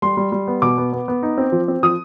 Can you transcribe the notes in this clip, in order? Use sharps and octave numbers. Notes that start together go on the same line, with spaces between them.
G3 C6
G3
G3
B3
B2 D6
B3
B3
B3
D#4
C4
F3
C4
F3 D#6